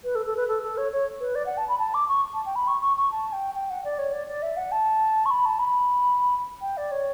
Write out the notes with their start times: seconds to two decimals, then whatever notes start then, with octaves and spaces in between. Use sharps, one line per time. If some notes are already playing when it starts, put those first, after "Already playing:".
0.04 B4
0.15 A4
0.26 A4
0.37 B4
0.48 A4
0.63 A4
0.78 C#5
0.92 C#5
1.20 B4
1.35 D5
1.46 F#5
1.58 A5
1.69 B5
1.79 A5
1.94 D6
2.08 C#6
2.34 A5
2.46 G5
2.56 B5
2.68 C#6
2.81 C#6
2.97 C#6
3.11 A5
3.33 G5
3.55 G5
3.70 F#5
3.84 D5
3.99 C#5
4.13 D5
4.28 D5
4.42 E5
4.57 F#5
4.72 A5
5.26 C#6
5.31 B5
5.46 A5
5.59 B5
6.61 G5
6.77 D5
6.91 C#5